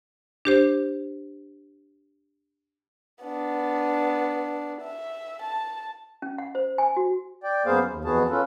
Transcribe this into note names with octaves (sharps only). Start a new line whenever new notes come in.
D4 G4 C5
B3 D4
E5
A5
C#4
F#5
C5
G#5
F#4
D5 G5
F#2 A#3 B3 G#4 C5 F5
D#2
F2 E3 B3 F#4 G#4 A5
C#4 F4 A4 B4